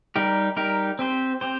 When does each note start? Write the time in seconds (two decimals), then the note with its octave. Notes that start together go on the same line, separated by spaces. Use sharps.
0.16 G3 D#4 G4 A#4
0.56 G3 D#4 G4 A#4
0.99 C4 G4 C5
1.41 C4 G4 C5